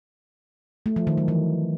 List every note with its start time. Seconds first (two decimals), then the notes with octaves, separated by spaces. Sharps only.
0.86 A3
0.96 F3
1.07 D#3
1.18 F#3
1.28 E3